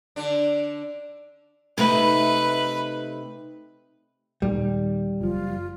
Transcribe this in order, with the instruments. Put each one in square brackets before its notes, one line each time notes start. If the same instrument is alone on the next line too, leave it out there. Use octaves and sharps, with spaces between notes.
[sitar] D3 D4
[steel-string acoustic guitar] C3 A3 D#4 [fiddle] B4
[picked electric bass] D#2 A#2 D#3 [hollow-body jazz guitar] G3
[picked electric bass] F#1 F3 [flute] F4